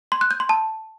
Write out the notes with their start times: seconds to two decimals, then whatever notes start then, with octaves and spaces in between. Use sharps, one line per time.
0.12 C6
0.21 F#6
0.31 G6
0.40 C6
0.49 A5